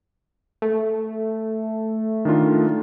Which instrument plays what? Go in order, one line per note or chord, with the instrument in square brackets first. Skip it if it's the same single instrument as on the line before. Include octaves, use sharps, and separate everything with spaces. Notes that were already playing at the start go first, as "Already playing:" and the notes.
[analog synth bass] A3
[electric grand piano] D#3 D4 F4